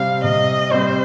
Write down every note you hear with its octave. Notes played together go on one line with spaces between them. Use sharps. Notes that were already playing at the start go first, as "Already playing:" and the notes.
Already playing: C3 G3 C4 F5
C3 D#5
G3 C4 C5